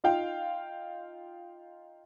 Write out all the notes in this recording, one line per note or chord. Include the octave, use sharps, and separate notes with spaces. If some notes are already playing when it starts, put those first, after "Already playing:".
D#4 F4 F5 G5